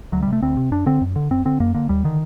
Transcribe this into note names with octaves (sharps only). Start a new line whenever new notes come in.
D2 F#3
C3 G3
A3
D2 C4
C3
F#2 D4
D3 C4
F#2
D3
F#2 C4
D3 C4
F#2 A#3
D3 A#3
D#2 G3
D3 D#3